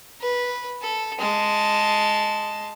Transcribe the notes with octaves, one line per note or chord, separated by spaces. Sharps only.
B4
A4
G#3 A5